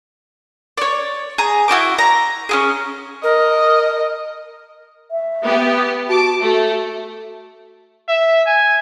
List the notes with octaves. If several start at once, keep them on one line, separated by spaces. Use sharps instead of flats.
C#5 D5
G#4 G#5 A#5
E4 F#4 G5 D6
A#5
C#4 E4 G#4
A#4 D#5
E5
B3 G4
F#4 A5 D6
A3 F#4
E5
G#5